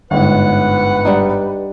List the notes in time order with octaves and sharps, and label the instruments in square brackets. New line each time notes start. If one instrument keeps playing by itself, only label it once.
[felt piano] G1 G#2 [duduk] B4 [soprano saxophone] F#5
[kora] G3 D4 D#4